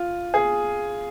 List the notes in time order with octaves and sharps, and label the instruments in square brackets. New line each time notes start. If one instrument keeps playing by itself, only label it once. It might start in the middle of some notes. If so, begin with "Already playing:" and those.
Already playing: [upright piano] F4
G#4